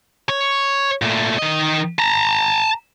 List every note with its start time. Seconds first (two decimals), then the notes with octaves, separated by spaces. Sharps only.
0.29 C#5
1.02 A#2 A3
1.39 D#3 D#5
1.99 A5 A#5